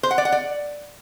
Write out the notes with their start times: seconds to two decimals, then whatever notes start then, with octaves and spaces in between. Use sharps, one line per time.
0.03 C5
0.11 F#5
0.18 D5
0.25 F#5
0.32 D5